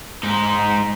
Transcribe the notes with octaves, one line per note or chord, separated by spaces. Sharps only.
G#2 D#4